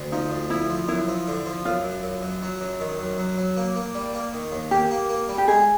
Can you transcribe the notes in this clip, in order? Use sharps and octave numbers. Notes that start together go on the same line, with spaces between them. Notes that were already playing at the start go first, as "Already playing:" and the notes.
Already playing: D2
F3 D#4
D2
F3 E4
F3
F#2 E4
F3
D3
F3
F#2 F4
F#2
F#2
F#2
F#3
F#2
D#3
F#2
F#3
F#3
A#3
A#3
G3
A#3
D#3
D#2
A#3 G4
A#3
A#3
G3
G4
G#3 G#4